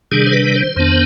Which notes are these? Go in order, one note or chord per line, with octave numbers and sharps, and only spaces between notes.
C3 D#3 G3 D4 G#4
C5
B4
C5
F2 D#3 B3 D4